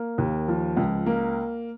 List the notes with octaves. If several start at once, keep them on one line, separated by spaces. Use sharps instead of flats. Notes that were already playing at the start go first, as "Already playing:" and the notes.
Already playing: A#3
D#2
F3
C#2
A#3